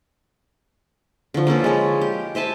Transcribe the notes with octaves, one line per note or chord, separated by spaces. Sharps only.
D3 F3
A#3 C#4 A4 B4
G#3 C#5
G4
C5 E5 G#5 A5